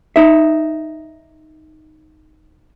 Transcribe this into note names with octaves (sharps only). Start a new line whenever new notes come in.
D#4 E5